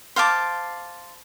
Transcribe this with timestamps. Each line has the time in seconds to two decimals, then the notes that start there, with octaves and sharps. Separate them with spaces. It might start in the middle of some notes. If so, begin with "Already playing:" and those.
0.16 C5 F5 A5 D6